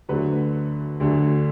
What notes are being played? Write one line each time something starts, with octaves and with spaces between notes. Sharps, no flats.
D2 D3 F#3 A3 B4
D2 D3 F#3 A3